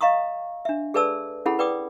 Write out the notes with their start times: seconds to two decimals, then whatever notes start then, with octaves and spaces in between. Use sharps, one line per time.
0.01 D#5 F5 A#5 C#6 D#6
0.65 D4 E5
0.94 G#4 A4 B4 D5 A5 E6
1.46 C#4 E4 G#4 A4 F#5 B5
1.59 B4 D5 G5 D6 D#6